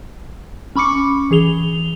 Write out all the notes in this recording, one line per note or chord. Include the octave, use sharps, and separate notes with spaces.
C#4 B5 C#6 D6 C#7
E3 G#4 F7 G7